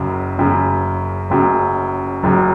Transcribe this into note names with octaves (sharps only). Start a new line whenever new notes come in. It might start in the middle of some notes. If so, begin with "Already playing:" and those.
Already playing: F#1 F#2 C#3
F#1 F#2 C#3
F#1 F#2 C#3
F#1 F#2 C#3